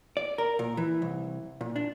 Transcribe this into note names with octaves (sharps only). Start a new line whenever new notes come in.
D5
A#4
A#2
E3
C2
A#2
D4